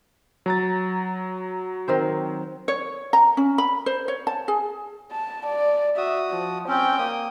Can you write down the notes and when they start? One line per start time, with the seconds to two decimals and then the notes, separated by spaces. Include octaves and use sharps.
0.46 F#3 A#5 A6
1.88 D#3 C4 C5
2.68 C#5
3.13 A#5
3.37 C#4
3.58 B5
3.86 C5
4.08 C#5
4.27 A5
4.48 G#4
5.12 A5
5.46 D5
5.97 F#4 E5 D#6
6.31 F3
6.68 C4 C#4 G5
6.99 A#3 D#6